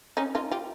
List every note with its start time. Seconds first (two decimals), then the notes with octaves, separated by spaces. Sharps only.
0.17 C#4 D#4
0.35 D#4 F4
0.51 F4 G4